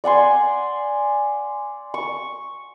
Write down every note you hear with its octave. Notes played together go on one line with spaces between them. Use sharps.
D5 F#5 G#5 C6
C#6